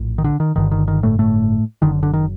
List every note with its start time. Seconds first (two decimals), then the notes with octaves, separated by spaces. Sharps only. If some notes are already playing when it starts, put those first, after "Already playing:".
Already playing: A#1 A2
0.18 D#3
0.24 D3
0.40 D#3
0.56 G1 G2 D3 D#3
0.71 D#3
0.88 D#3
1.03 A2 A3
1.19 A2 A3
1.82 F#1 F#2 D3 D#3
2.03 D3
2.13 D#3